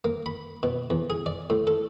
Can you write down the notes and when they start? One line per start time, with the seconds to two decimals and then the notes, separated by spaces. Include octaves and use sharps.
0.04 A#3
0.26 B5
0.63 B2
0.90 E2
1.10 G#4
1.26 D5
1.50 A2
1.67 A4